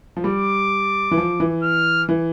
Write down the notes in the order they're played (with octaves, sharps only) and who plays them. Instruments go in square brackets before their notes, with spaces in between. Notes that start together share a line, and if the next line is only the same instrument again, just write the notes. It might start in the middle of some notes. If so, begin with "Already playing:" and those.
[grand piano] F3
[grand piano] G3 [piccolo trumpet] D6
[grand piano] E3
F3
E3
[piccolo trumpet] F6
[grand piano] E3